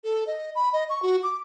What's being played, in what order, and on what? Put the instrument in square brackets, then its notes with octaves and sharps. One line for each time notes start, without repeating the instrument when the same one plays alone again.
[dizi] A4
D#5
B5
D#5
C#6
F#4
D6